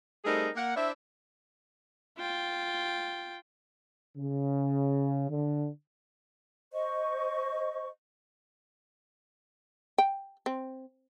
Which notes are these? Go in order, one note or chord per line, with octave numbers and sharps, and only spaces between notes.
G3 A3 C4 D#4 G#4 A#4
A#3 F#5
D4 E4 C5 D5 E5
F4 G5
C#3
D3
C5 D#5 C#6
G5
C4